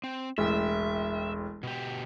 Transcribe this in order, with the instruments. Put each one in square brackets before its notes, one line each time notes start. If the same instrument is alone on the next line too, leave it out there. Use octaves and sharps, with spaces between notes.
[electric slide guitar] C4
[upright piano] E1 A1 [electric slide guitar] E5
[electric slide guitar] B2 G4